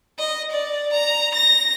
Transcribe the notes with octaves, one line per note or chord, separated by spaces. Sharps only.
D#5
D5
A#5
A#6